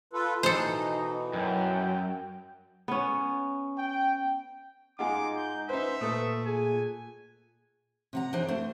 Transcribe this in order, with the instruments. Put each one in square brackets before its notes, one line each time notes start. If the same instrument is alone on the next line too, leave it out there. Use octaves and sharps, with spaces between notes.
[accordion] F4 A4 B4
[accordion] B2 E3 [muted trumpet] D#4 [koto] A4 C5
[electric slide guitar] F#2 [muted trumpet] G5
[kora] B3 C#4
[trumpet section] G5
[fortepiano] G#2 G#3 F4 [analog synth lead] D#4 [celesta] F#5 G#5 [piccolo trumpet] D6
[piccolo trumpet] G6
[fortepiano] D#4 B4 [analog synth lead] C5 [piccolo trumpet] E5
[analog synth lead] A#2 [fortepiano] A3 A4 B4 [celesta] D#6
[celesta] G#4 [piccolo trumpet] G#5
[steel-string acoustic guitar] C3 F#5 A#5
E3 D4 D#4 G#4 C5
A3 C5